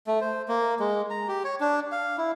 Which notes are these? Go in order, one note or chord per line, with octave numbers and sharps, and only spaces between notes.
A3
C5
A#3
G#3
A#5
G4
C#5
D4
F5
E4